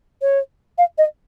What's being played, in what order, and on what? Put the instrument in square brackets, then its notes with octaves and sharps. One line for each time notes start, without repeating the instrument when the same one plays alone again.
[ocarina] C#5
F5
D#5